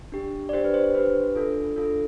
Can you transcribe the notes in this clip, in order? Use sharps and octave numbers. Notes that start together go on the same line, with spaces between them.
D4 G4
D5
D4 G4 C5
B4
C5
C5
D4 G4 B4
D4 F4 A4
D4 F4 A4